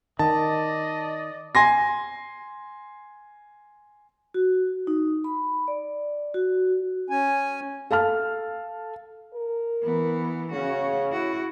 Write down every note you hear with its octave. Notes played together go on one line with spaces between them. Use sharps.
D#3 D5 D#5 A5
G#5 C6 A#6
F#4
D#4
B5
D5
F#4
C#4 G#5
A4 F5 A5 F6
A#4
E3 B3
C#3 C#4 F#4
E4 F#4